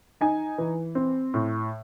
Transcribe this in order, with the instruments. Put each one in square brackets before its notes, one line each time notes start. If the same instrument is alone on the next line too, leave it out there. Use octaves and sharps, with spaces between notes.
[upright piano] D#4 G#5
E3
C4
A2